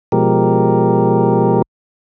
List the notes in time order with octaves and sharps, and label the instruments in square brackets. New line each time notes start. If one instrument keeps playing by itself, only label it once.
[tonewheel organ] B2 F3 G#3 G4 A#4